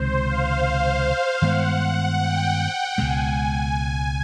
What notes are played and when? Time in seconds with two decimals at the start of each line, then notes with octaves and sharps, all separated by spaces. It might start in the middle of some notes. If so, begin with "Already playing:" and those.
Already playing: C#2 C3 D#3 G#3 C5
0.26 F5
1.42 G2 D#3 G#3 B3 F#5
2.20 G5
2.98 C#2 B2 G#3 G#5